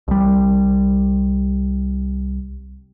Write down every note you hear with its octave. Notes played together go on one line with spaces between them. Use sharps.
C2 G3